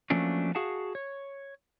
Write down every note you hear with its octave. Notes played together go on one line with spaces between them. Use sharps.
F3 F#3 A3 A#3 C#4 D4
F#4 G#4 F5 F#5 A5
C#5